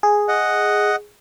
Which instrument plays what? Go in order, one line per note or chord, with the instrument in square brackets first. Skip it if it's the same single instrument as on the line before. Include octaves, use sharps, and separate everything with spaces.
[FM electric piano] G#4
[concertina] D#5 F#5